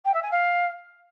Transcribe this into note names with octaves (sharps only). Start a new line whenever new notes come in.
G5
E5
G#5
F5